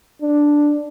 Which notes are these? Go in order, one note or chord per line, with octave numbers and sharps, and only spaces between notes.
D4